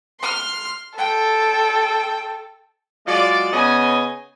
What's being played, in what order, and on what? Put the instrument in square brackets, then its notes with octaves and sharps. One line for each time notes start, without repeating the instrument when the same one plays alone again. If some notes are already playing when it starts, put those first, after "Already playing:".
[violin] C6 F6
[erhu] A4 [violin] G5
[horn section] F#3 G#3 F4 D5
C#3 B3 C#5 D#5 G#5